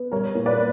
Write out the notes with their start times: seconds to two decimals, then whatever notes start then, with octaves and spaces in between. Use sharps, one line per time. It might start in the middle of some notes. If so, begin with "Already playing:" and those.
Already playing: B3
0.12 G3 A#4 C#5
0.35 A#2
0.46 B4 D5